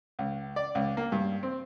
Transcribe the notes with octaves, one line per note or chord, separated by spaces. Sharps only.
C#2
D5
C#2
A#3
G2
C4